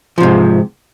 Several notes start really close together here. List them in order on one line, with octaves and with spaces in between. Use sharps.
F3 C3 G#2